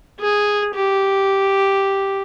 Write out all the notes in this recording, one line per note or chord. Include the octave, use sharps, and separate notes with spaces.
G#4
G4